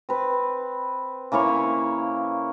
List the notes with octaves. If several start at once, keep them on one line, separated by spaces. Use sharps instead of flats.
C4 B4
C#3 A#3 E4 C#5